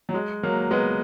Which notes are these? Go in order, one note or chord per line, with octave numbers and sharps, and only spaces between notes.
F#3
G#3
F#3 A#3
G#3 B3